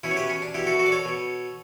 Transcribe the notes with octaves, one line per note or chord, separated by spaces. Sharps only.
B2 C#4 E4
C#5
G4 B4
C#4
D4
B2 E4 G4
F#4 A4
F#4 A4
D5
A4 C#5
B2